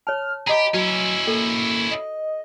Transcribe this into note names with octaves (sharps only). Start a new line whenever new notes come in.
C#5 A5 F6
G4 G#4 D#5 A#5 B5
F#3 C#4 E4 F#4
A#3 A4
D#5